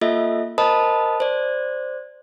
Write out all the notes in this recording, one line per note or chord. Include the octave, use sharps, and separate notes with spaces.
A#3 F4 A4 D#5 E5
A#4 C5 D#5 A5 B5 D#6
C5 D5